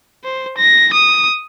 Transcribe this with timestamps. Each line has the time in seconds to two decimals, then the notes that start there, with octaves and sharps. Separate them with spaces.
0.24 C5
0.57 A#6
0.93 D#6